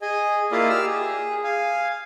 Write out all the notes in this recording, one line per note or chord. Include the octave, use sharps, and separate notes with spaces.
G#4 D#5 G#5
A#3 E4 F4 D5 D#5 F5
G4 E6 F6
G#4
F5 G#5